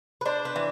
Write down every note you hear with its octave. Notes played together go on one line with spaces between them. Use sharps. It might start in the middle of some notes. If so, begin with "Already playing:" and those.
B4
D4 C5
B4
E3